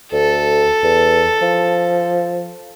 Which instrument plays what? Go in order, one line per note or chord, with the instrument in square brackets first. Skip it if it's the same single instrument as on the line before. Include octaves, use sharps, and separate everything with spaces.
[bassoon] D2 [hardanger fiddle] A4
[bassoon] E2
F3